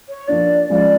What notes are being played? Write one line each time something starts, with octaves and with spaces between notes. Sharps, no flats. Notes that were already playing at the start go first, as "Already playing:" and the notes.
C#5
F3 A#3 D4 F4 D5
F3 G#3 C#4 F4 D5